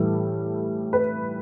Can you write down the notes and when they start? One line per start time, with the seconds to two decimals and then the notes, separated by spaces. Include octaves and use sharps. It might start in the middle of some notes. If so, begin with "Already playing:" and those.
Already playing: A2 E3 G3 A4
0.93 B4